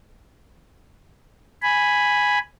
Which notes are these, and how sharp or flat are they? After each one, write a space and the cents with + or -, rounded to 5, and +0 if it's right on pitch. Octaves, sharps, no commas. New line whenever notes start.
G#5 +0 B5 +0